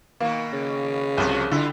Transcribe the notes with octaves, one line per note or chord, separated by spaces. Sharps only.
B2 D#3 A#3
C#3
C2 F2 F3 F#4
D3 G3 E4 F4